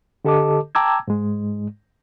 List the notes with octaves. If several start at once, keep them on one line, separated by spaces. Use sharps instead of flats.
D3 G4 A4 D#5 A5 D6
G5 A5 A#5 D6 E6 G#6
G#2 G#3